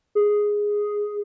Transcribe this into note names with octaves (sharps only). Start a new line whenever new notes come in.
G#4